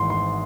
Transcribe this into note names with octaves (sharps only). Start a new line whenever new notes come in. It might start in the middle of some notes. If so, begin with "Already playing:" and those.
Already playing: G#1 G#2 E3 C6
C6